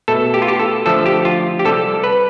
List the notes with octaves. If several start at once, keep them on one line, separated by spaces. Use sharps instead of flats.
B2 A3 A4
G4
F4
G4
A4
D3 F3 A3 A4
G4
F4
G4
C3 G3 A4
B4